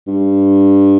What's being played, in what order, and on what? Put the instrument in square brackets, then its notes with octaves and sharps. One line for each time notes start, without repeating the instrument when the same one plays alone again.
[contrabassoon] G2